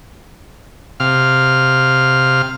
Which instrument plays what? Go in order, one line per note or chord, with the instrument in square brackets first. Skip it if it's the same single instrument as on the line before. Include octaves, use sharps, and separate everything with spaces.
[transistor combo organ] C3 F5 F6